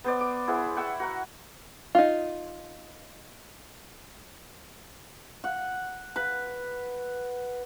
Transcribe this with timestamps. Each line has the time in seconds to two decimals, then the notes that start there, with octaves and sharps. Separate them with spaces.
0.04 B3 C5 D5
0.21 D6
0.47 E4 G#4 C5 F#5
0.76 F#5 G5 C#6 E6
1.00 F#4 A#4 F#5
1.95 D#4 F4
5.44 F#5
6.16 B4